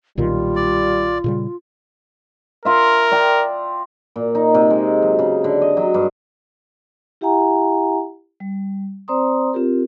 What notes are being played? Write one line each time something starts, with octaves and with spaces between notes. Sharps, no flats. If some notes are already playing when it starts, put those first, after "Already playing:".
B1 A#2 D#3 G3 F4
D5
A#2 C#3 G3
F4 A#4 E5
D5 G5 A#5
A#2
D#4
C3
G#3
F#3
C#3
D3
D#5
F#3
G2
E4 G4 E5 F#5 G#5 A#5
G3
C4 C5 D5 A#5 C6 D#6
C4 F4 G4 A#4